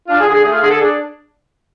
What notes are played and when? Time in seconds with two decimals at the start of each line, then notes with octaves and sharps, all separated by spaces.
0.08 D4 F4
0.20 G#4
0.26 D3
0.32 G#4
0.43 A3 G#4
0.52 F4
0.61 D3 G#4
0.71 A4
0.79 D4 G#4